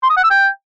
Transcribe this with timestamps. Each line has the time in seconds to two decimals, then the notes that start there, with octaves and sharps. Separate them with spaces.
0.03 C6
0.10 D#6
0.17 F#5
0.23 E6
0.30 G5